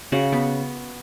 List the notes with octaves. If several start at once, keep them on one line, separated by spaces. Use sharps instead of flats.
C#3 F#4
B3